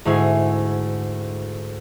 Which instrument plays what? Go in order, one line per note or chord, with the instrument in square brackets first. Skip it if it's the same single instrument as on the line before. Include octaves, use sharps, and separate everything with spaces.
[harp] D2 G#2 E4 G#4 G#5 C7